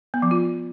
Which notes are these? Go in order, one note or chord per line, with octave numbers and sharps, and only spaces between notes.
B3
F3
F4